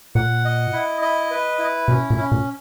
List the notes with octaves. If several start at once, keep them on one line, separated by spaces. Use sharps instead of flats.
A#2 F#5
D#5
E4
D#5
B4
E4
B2 C#4
A#2
C#4
A#2